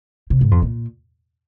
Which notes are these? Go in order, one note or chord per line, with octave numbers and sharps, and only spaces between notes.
C3
G#2
F2
A#2